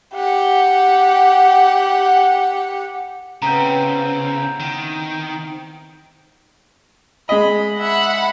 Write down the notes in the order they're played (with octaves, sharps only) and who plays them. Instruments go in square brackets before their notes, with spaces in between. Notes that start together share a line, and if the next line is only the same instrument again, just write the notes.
[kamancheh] G4 F#5
[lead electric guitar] C#3 [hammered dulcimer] B3 C4 E4 [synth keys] A#5 G6
[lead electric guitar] D#3
[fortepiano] G#3 D#5 [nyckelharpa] B5
[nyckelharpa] E5 [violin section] F#5 B5